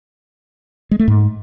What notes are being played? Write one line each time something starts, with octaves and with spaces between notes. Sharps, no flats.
G#3
A3
G#2